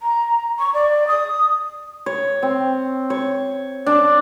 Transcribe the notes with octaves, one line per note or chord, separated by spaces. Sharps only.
A#5
C#6
D5
D#6
C#5
C4
C#5
D4